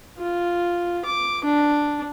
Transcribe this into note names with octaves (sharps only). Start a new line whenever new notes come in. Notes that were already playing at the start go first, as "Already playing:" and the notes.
F4
D6
D4